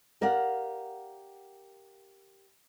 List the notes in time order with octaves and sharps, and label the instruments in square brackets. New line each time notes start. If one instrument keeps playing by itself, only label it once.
[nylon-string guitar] G4 A#4 D5 F5 F#5